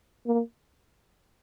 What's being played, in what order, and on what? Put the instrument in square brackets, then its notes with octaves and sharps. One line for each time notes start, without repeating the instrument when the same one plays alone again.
[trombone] A#3